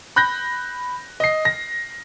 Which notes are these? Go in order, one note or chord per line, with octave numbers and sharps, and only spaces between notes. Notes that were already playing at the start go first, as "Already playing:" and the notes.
B5 F#6 G6 A#6
D#5 C7
A#6